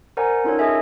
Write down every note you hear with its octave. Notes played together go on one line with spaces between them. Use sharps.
A#4 C5 D5 F#5 G#5 A#5
C#4 D#4 F4 A4 A#4 C#5
G#4 A4 C#5 D#5 E5 G#5